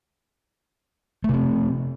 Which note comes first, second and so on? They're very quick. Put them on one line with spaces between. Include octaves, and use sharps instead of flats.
A3 C3 C4